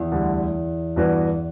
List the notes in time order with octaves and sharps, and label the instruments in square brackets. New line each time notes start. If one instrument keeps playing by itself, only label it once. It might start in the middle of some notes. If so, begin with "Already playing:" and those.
Already playing: [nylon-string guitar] E2
[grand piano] D2 D3 G3
G2 E3 B3 F#4